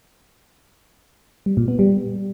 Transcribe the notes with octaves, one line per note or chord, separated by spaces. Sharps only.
G3
A#2
B3
G3